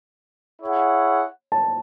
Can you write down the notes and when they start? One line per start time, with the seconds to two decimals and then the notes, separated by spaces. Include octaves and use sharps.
0.61 E4 G#4 C#5 F#5
1.52 A5